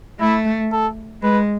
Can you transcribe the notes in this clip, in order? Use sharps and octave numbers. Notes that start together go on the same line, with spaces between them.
A3 E4
A4
G#3 B4